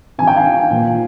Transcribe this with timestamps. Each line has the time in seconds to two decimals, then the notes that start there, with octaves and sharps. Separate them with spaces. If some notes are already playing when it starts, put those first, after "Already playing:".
0.18 C3 F3 G#5
0.27 G5
0.36 F5 G#5
0.70 A#2 F3